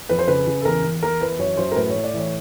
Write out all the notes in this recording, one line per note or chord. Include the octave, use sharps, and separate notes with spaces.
F2 B4
C5
C#3 B4
C#3
A4
E2 A#4
E2
E2 A#4
E3 B4
F#2 C#5
F#2 C5
A#4
A2 B4
C#5
A2
D5
E3 C#5